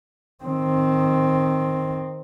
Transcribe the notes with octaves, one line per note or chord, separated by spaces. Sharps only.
D#3 C4